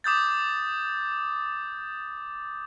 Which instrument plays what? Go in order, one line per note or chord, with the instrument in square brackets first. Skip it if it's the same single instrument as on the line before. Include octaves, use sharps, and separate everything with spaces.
[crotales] D6 D#6 G6 A6